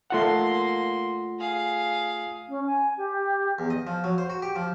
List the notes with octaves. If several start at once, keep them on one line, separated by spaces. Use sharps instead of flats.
A3 A#3 F4 F#5 C6
G#4 F5
C#4
G#5
G4
E2
D#5
F3
F#3
C5
F#4
G4
F3